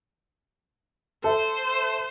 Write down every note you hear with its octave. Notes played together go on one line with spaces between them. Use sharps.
A4 C5 E5